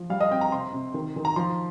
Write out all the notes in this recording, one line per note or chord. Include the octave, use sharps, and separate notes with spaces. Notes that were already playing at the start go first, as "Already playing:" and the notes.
Already playing: F3
G3 F5
D#5
C4 G5
A#5
C3 C6
C3
D#3
D#3
A#5
F3 C6